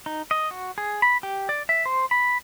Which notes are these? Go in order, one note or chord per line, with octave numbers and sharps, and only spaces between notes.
D#4
D#5
F#4
G#4
B5
G4
D5
E5
C5
B5